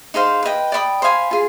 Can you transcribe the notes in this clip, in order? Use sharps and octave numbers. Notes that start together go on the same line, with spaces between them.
D#4 G#4 C5 F5
B4 D#5 G5
D5 G5 B5 D#6
C5 F5 G#5 B5
F4 G#4